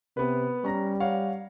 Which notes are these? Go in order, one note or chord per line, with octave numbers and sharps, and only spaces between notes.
C3 B3 B4
G3 C#4 A#5 A#6
C#5 F5 F#5